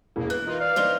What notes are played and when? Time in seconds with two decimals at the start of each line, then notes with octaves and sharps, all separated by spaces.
0.16 E1 E3 A#3
0.30 E3 F#6
0.46 D#4 F4 A#4
0.60 D5 F5
0.76 E3 C#4 D#4 C5 G7